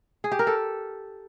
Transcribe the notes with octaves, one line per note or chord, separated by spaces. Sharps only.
G#4
G4
A#4
A4